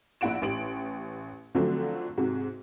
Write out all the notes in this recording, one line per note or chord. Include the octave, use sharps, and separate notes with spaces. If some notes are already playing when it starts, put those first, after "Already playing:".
A#1 A#2 E4 F#5 D7 E7
A1 G4 D7 F#7
D3 F3 F#3 A3 C4
G#2 C3 F#4